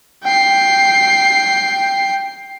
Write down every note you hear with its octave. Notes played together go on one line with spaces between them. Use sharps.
G5 C7